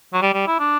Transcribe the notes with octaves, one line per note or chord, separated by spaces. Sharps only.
F#3
G3
G3
E4
D4